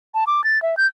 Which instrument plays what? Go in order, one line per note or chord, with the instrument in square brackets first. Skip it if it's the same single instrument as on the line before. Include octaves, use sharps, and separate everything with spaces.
[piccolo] A5
D6
A6
E5
G6